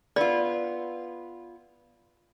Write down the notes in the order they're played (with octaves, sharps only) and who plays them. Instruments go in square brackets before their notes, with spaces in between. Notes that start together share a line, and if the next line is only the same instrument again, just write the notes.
[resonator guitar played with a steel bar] B3 F4 [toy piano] D5